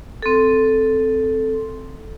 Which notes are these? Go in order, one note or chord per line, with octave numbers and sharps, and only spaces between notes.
C4 A4